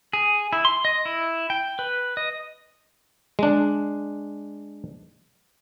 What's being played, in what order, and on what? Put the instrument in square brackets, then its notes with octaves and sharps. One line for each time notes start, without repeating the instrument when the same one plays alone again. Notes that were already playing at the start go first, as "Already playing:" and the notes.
[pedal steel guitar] G#4
E4
C6
D#5
E4
G5
B4
D#5
[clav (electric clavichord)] G#3 D4